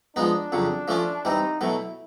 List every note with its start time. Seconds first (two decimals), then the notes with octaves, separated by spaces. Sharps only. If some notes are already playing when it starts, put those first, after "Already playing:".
0.16 F3 G#3 B3 D4 D#4
0.52 F2 C#3 F#3
0.88 F3 A3 C#4 F4
1.25 E3 G3 C4 D#4
1.60 B2 F#3 A3 E4